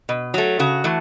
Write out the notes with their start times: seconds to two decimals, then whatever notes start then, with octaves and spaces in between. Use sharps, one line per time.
0.09 B2
0.34 F#3 A3
0.59 C#3 F#4
0.84 E3 A3